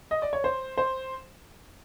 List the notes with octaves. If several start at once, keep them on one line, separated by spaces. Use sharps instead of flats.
D#5
D5
C#5
C5
C5